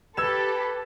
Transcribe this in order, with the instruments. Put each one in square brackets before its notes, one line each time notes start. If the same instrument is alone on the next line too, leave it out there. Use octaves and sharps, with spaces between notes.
[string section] G4 A4 [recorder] B4 [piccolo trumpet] B5 [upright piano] E6 G#6 E7